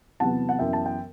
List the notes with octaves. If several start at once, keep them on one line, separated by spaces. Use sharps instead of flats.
E2 C3 F#3 B3 F#5 A5
F#5
F#2 E3 B3 E5 G5
A5
G5